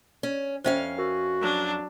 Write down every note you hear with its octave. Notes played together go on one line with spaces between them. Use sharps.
C#4
F2 C#4 C5 E5 F5 G5
F#4 A#4
F#3 D4